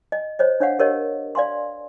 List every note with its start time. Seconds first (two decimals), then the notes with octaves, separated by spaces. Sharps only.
0.12 D#5
0.39 C5 C#5 D#5
0.60 D4 C#5 F5 F#5
0.79 G4 A#4 C#5 D#5
1.35 D5 F5 G#5 C6